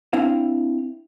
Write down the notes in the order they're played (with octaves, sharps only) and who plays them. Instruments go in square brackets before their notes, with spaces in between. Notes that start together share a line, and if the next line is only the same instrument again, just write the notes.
[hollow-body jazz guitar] C4 D4 E4 F5